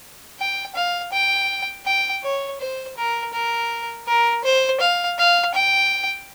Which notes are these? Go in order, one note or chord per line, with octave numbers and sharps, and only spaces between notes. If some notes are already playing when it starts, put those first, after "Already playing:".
G5
F5
G5
G5
C#5
C5
A#4
A#4
A#4
C5
F5
F5
G5